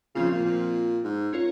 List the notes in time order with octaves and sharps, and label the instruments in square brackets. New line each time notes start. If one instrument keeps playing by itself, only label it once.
[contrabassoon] C#3 [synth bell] F3 C4 F4
[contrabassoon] A#2
A#2
G#2
[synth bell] C#4 F4 A#4 C#5